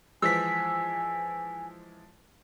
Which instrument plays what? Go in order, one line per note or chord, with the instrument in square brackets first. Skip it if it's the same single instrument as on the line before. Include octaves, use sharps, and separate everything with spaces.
[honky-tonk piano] E3 F3 G#3 [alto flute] G#5 [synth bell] E6 B6